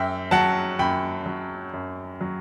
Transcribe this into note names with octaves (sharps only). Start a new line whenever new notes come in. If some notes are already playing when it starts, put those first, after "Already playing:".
Already playing: F#2 E5 G5
F#3 F#5 A5
F#2 G5 B5
F#3
F#2
F#3